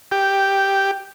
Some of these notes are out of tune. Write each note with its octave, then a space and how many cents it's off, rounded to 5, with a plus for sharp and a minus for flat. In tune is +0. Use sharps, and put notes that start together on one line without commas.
G4 +0